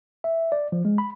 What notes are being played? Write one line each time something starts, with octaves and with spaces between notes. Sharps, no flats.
E5
D5
F3
G#3
B5